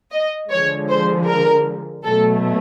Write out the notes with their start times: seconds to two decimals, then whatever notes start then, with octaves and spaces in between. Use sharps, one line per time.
0.12 D#5
0.50 D3 F3 G#3 C#5
0.88 C5
1.26 A#4
2.03 B2 F#3 A3 A4